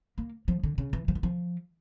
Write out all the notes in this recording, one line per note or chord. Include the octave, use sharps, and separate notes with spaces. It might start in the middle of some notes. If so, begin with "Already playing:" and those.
A#3
F3
D3
C#3
E3
F3
E3
F3